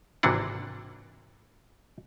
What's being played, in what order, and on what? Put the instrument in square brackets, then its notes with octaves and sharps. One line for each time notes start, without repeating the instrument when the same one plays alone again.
[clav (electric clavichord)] G#1 C3 E3 A#3 D4 F#5